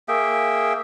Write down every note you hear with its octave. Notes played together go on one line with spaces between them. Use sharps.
A#3 G#4 E5 G5